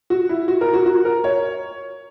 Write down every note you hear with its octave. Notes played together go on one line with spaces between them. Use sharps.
F#4
E4
F#4
A#4
F#4
F#4
A#4
C#5